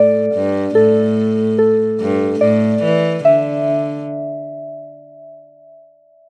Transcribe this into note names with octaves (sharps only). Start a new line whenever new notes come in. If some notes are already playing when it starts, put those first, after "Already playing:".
Already playing: A2 A4 D5
G2
A2 A4
A4
G2
A2 D5
E3
D3 E5